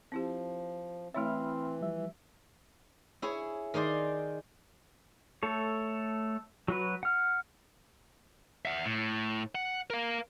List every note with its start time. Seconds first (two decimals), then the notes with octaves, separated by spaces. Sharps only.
0.12 F3 C4 E4 G4
1.14 E3 A3 C4 E4 C#5 E5 B5 F6
1.81 F3 G3 E5
3.22 E4 G#4 C#5
3.74 D#3 D#4 G#4 D5 C6
5.43 A3 A4 C#5
6.68 F#3 F#4 B4
7.03 F#5 F6
8.65 E5 F#5
8.85 A2
9.55 F#5
9.90 A#4 F5